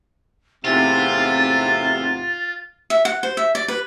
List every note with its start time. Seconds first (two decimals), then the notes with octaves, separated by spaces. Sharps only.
0.65 E2 A2 C3 C4 D#4 F4 F#5 A6
2.90 E5
3.05 F#5
3.23 C5
3.37 E5
3.55 D5
3.68 B4